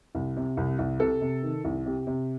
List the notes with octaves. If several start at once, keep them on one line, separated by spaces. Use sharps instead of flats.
C2
C3
C2
C2
C3 A4
C3
D#3
C2
C3 G4
C3